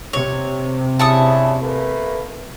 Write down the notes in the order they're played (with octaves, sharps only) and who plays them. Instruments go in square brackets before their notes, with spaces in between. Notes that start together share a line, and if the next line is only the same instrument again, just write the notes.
[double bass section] C3 [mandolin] C#5
[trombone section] C#3 D4 E4 [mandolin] A5 C#6 D#6
[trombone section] A3 A#3 B4